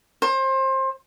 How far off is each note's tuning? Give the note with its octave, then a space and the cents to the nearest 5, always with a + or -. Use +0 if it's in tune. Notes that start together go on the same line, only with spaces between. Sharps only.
C5 +25